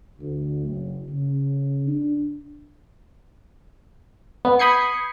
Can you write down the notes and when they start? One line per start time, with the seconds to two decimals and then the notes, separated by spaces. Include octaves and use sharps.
0.19 D2
0.64 F#1
1.08 C#3
1.87 D4
4.45 B3
4.59 B5 D#6 G6 G#6 C7 C#7